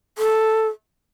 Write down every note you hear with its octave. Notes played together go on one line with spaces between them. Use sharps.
A4